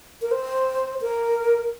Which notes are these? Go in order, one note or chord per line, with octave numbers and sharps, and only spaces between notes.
A#4
C5
A#4